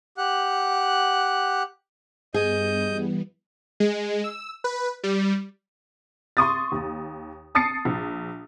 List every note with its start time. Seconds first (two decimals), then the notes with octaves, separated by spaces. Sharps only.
0.17 G4 F#5 F#6
2.34 G2 G3 B3 G#4 D#5 G6
2.88 E3 G3 B3
3.80 G#3
4.24 E6
4.64 B4
5.03 G3
6.37 C6 C#6 D#6 A6
6.72 D#2
7.55 A5 D#6 A6 C7 C#7
7.85 A#1